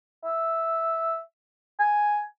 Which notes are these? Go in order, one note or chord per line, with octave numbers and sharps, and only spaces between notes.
E5
G#5